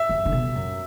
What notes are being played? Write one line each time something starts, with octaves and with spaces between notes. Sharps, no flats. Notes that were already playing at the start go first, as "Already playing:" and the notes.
Already playing: E5
F#2
D3
B2
F#2